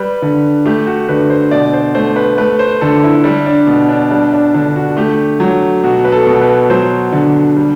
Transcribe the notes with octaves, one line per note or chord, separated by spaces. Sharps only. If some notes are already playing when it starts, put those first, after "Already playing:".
Already playing: G3 B4
D3
A3 G4
F#4
D3 B4
C5
B2 D5
C5
A3 C5
B4
A3 B4
C5
D3 A4
E4
G3 D4
D4
B2
D4
G3 D4
D4
D3 D4
F#4
A3 G4
F#3
B2 F#4
B4
A4
B2
B4
F#3 C5
D3
G3